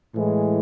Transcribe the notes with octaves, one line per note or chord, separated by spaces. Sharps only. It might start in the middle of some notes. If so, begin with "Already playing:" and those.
A2 E3 G#3